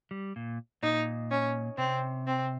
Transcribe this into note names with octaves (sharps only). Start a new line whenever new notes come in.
G3
A#2
A#2 D#4
C#4
C3 C4
C4